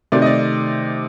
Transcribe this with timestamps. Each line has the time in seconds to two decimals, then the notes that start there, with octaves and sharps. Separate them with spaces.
0.12 C3 D#3 A3 D5
0.22 D#5
0.26 D5